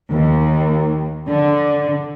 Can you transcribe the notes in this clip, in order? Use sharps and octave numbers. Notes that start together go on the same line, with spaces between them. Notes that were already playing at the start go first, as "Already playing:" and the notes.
D#2
D3